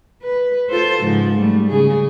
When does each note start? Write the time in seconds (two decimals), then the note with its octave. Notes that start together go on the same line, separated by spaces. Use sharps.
0.22 B4
0.70 F4 A4 C5
1.02 G#2 C#3 F3
1.37 G3 A3
1.68 C#3 G#4